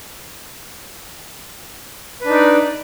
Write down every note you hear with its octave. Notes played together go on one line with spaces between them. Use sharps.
D4 D#4 B4 D5